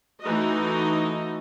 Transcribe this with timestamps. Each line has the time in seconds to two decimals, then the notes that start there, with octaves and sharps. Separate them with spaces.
0.22 E3 A3 D#4 F#4 D#5